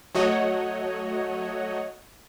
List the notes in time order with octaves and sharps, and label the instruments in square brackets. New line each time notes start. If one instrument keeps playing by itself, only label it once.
[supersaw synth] F#3 A3 F#4 C#5 D#5